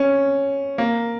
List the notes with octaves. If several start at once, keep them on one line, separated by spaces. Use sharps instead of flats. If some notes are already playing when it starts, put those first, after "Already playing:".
Already playing: C#4
A#3